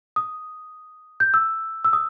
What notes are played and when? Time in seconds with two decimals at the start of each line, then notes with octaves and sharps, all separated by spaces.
0.16 D#6
1.20 G6
1.34 E6
1.84 E6
1.93 D#6